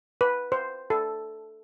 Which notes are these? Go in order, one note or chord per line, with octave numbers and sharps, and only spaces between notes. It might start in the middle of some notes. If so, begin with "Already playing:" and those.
B4
C5
A4